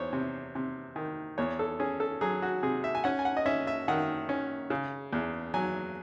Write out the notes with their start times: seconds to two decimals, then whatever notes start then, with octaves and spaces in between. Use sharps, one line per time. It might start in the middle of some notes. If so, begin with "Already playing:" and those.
Already playing: E2 C5 C#5
0.13 C3
0.55 C3
0.96 D#3
1.38 E2 C#5
1.59 A4
1.80 C#4 G#4
2.00 A4
2.21 F#3 G#4
2.42 F#4
2.63 C3 G#4
2.84 E5
2.95 G#5
3.04 C#4 F#5
3.19 G#5
3.25 F#5
3.37 D#5
3.46 C#4 E5
3.67 E5
3.88 D#3 F#5
4.29 C#4
4.70 C#3
5.13 E2
5.54 F#3 G#5